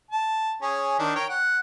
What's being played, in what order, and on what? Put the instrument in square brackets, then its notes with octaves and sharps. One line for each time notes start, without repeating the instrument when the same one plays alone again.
[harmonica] A5
C#4 G#4
D#3 D4
A#4 C#5 G5
F#5